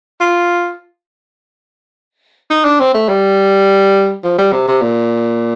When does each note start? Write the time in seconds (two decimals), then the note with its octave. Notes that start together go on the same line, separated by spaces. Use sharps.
0.21 F4
2.50 D#4
2.65 D4
2.80 C4
2.94 A3
3.09 G3
4.24 F3
4.38 G3
4.52 C3
4.68 C3
4.82 A#2